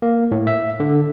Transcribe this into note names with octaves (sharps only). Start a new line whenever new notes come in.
A#3
A2
E5
D3